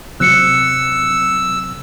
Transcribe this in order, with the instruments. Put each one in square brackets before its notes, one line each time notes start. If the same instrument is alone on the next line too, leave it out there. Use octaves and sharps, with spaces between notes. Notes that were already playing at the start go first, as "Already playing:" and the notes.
[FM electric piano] C3 F#3 C4 [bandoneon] E6 [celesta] F#6 C#7